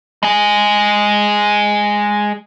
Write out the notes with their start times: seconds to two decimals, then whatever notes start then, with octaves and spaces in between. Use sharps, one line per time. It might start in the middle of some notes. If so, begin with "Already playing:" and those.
0.23 G#3 G#4